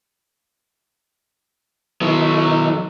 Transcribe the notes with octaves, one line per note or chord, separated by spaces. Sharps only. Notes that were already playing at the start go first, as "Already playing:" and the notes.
D#3 F#3 B3 E4